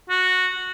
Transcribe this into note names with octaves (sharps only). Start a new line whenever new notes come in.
F#4